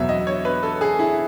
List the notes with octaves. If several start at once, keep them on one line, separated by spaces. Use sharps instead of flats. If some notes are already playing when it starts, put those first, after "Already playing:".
Already playing: E2 B2 F#3 B3 E5
D#5
C#5
B4
A4
G#4
E4